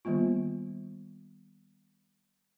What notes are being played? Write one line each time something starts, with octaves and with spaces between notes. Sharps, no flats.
D#3 G3 A#3 B3 F4